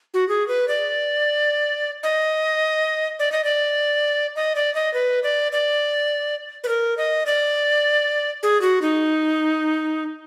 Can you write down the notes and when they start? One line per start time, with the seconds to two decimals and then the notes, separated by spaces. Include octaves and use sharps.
0.14 F#4
0.29 G#4
0.48 B4
0.68 D5
2.03 D#5
3.19 D5
3.32 D#5
3.44 D5
4.36 D#5
4.56 D5
4.75 D#5
4.94 B4
5.23 D5
5.52 D5
6.64 B4
6.68 A#4
6.98 D#5
7.26 D5
8.43 G#4
8.62 F#4
8.82 D#4